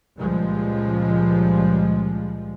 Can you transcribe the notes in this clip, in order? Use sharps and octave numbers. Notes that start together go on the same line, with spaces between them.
C#2 A#2 F3 G3 G#3